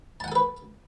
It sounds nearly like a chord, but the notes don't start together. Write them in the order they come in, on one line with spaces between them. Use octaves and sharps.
A5 F#5 G#5 A4 B4